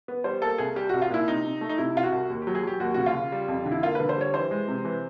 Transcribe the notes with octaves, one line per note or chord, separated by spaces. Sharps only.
B3
G3 C5
A#3 A4
C2 G#4
G3 G4
C2 F#4
F4
A#2 E4
C3 D#4
C3
A3
D#4
C3 E4
C3 F4
F#4
C2
D#2
G4
F#3
G#4
F#3 G4
D#2 F#4
C#3 F#4
F4
C#3
G3
F2
D3
E4
A#3 F4
D3 B4
C5
G3 C#5
E3 C5
G#3
C3
E3